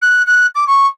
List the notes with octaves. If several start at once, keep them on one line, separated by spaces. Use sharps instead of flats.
F#6
F#6
D6
C#6